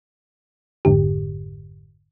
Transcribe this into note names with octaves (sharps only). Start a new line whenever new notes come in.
G#1 F2 G#2 D3 G4